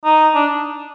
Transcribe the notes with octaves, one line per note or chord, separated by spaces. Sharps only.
D#4
D4